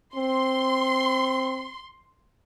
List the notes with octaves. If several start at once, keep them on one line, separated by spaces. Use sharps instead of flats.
C4 C6